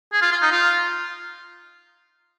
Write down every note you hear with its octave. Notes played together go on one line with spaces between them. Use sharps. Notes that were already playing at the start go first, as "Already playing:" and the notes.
G#4
F4
F4
D#4
F4